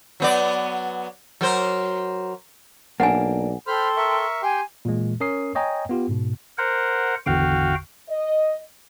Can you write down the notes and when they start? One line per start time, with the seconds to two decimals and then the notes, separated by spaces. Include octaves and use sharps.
0.20 F#3 B3 D5
1.41 F#3 A#4 C5
3.00 B1 A#3 D4 F#5 G#5
3.67 A4 C5 G5 B5 C6 F6
3.96 A#4 E5 C#6
4.42 G4 G5 G#5 C6
4.85 A#2 E3 G#3
5.20 C#4 A#4 C#5 D#6 C7
5.55 C#5 D#5 G5 G#5 A#5
5.89 B3 F4 G4
6.09 G#2 B2
6.58 A#4 C5 F#5
7.26 G#1 E2 D3 F#4 F5 G5
8.09 D#5